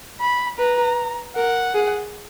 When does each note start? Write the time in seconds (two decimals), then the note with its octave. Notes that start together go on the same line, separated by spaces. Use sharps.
0.20 B5
0.58 B4 A#5
1.36 A#4 F#5
1.74 G#4